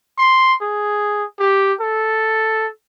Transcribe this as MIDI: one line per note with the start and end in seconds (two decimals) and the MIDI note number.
0.18 0.54 84
0.62 1.24 68
1.39 1.73 67
1.80 2.67 69